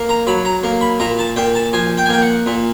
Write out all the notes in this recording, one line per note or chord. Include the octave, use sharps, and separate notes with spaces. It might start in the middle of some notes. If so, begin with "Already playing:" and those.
Already playing: A#3
A#5
F#3 B5
A#5
A#3
B5
A#2 A#5
A5
A#2 G5
A5
F3 G#5
G5
G#5
A#3 G5
F#5
A#2